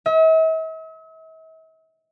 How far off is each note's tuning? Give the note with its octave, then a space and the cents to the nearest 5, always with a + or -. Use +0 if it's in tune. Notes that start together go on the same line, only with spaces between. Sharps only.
E5 -45